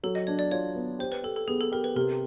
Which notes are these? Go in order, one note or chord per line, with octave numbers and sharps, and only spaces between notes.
F#3 A4
D#5
D4 C#5
D5
F4 C#5
B3
G4 C5
B4
G4 A4
A4
B3 G#4
A4
G4 A#4
B4
C3 A#4